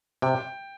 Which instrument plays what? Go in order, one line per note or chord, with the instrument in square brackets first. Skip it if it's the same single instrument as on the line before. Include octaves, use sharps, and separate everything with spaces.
[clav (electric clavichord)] C3 [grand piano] G5